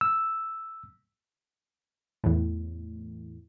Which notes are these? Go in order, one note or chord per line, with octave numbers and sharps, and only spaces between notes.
E6
E2 A2